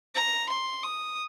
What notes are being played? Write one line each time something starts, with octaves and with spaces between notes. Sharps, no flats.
A#5
C6
D#6